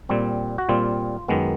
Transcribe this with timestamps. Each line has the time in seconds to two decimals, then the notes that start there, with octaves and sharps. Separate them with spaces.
0.09 A#2 G3 C4
0.58 F#4
0.69 A#2 G3 C4 F4
1.28 F#2 D#3 G#3 B3